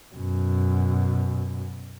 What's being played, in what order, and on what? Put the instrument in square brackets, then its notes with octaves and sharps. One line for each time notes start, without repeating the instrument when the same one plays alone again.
[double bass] F#2 B2